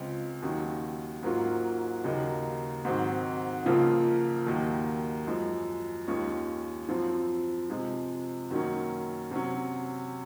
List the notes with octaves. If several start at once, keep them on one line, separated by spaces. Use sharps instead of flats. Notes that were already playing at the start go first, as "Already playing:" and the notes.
Already playing: C#2 C#3 G#3 C4 F4
D#2 D#3 F#3 C#4
G#2 F#3 A#3 C#4 F4
D#2 C#3 F#3 A#3 D#4
G#2 D#3 F#3 C4
C#2 C#3 F3 A#3 F4
D#2 D#3 F#3 A#3
F#2 F3 G#3
D#2 D#3 G#3 C#4 F4
F#2 F3 C4 F4
C3 F3 G#3
F#2 D#3 F#3 A#3 C#4
C3 F#3 C#4